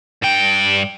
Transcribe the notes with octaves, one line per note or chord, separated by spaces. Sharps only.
G2 G5